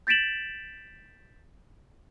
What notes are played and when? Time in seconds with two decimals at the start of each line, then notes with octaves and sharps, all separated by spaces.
0.07 G6 A6 B6 D7 E7 F#7